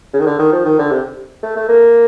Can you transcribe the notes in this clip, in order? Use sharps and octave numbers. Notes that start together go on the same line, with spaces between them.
C#3
D#3
D3
D#3
F3
D#3
D3
C3
A3
A3
A#3